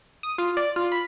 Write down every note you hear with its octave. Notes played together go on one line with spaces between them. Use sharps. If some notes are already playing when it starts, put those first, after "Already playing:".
D#6
F4
D5
F4
B5